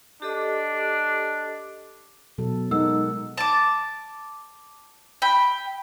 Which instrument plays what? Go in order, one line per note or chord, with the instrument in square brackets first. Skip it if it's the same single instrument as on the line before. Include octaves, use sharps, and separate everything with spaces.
[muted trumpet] D4 [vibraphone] G4 A4 D#5
[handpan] B2 F#3 A4
[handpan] G#3 A#4 F#5 [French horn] D#4 [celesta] E6
[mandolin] A5 D6
G5 B5